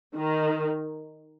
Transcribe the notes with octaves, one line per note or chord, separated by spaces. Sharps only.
D#3